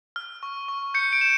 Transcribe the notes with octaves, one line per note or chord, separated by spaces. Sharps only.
F6
C#6
C#6
G6 C#7
D7
G6 E7